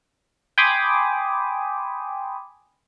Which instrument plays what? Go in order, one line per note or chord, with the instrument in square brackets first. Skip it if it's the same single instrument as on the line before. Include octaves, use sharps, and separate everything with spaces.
[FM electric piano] G5 G#5 B5 C6 D6 D#6